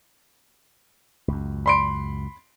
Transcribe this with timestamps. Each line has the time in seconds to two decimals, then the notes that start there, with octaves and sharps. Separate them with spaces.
1.28 C#2 F#2
1.66 B5 C6 D7